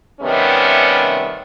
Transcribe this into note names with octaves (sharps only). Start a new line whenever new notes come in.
C3 D#3 G3 A3 B3 C#4